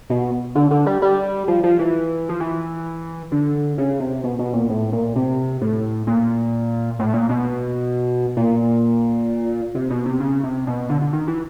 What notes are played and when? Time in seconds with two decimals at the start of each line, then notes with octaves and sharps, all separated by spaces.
0.10 B2
0.55 D3
0.71 D3
0.86 G3
1.02 G3
1.48 F3
1.63 F3
1.79 E3
2.29 F3
2.40 E3
3.32 D3
3.78 C#3
4.00 C3
4.24 B2
4.39 B2
4.53 A#2
4.69 A2
4.92 A#2
5.16 C3
5.61 A2
6.07 A#2
6.99 A2
7.14 A#2
7.29 B2
8.37 A#2
9.75 C3
9.90 B2
10.06 C3
10.20 C#3
10.43 C3
10.67 B2
10.89 D3
11.01 D3
11.13 D#3
11.27 E3